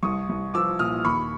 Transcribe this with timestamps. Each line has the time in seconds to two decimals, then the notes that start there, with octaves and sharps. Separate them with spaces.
0.03 C2 C#6 D#6
0.29 C2
0.54 F3 D6 E6
0.79 A#2 D#6 F6
1.05 D#2 B5 C#6